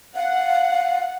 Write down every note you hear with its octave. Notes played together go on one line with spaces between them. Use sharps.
F5 F#5